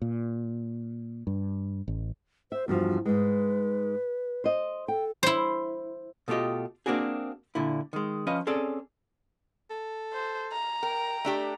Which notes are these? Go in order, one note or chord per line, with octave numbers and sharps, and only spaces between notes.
A#2
G2
A1
C5 E5
E2 G2 F3 F#4
G#2 G#3 B4
C5 D#5
A4 G5
E4 C5
B2 A3 F4 G4 D#5
A#3 C4 D4 F#4 G#4
A#2 D3 E4
D#3 G#3
F3 C#4 B4 D#5 F5
C4 C#4 G#4 A4 D5
A4
C5
A#5
A#4 G5
A3 D4 G4